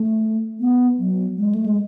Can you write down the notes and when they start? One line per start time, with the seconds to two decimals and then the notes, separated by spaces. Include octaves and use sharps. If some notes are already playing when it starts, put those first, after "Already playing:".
Already playing: A3
0.60 B3
0.99 F#3
1.38 G#3
1.55 A3
1.66 G#3